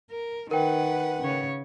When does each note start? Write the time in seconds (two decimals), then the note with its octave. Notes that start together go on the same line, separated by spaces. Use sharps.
0.10 A#4
0.51 D#3 A#4 B4 F#5 G5
1.20 C#3 C#5